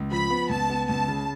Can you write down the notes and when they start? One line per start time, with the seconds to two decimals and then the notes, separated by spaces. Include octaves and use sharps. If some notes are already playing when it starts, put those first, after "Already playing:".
Already playing: C#2
0.11 F3 B5
0.30 B3
0.49 C#2 A5
0.70 B3
0.88 C#2 A5
1.08 C#3